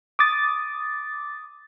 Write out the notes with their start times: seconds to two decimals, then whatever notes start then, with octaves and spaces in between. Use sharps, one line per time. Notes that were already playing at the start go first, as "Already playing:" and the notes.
0.19 D6 D#6 A6